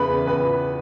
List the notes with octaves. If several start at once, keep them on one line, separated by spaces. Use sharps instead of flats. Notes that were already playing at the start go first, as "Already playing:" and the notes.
Already playing: E2 C#3 E3 B3 B4 B5
B4 B5